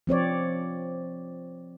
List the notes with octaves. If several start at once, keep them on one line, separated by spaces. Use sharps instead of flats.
F3 C4 C#5 D5